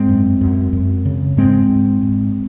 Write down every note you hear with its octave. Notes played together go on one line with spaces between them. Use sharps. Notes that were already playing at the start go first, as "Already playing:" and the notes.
Already playing: G#2 G#3 C4
F#2
F#2
F#2
C#3
G#2 G#3 C4
G#2
G#2